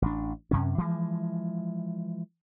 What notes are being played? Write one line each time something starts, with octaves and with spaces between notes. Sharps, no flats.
A1 D4
F#2 C3 C#4
E3 F3 G#3